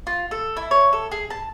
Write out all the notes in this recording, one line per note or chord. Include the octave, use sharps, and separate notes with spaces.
F4
A4
E4
C#5
A4
G#4
A5